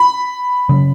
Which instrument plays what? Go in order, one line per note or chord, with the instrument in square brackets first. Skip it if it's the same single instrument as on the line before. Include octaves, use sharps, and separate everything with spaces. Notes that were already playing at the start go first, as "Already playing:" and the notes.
Already playing: [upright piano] B5
[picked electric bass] C#3 F#3 C#4